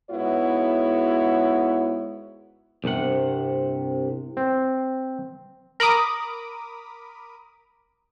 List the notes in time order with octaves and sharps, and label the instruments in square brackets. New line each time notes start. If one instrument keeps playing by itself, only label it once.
[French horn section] G#2 G#3 B3 E4 F#4 C#5
[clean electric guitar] C2 G2 C3 F#5
[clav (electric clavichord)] C4
[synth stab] A#4 B5 D6 D#6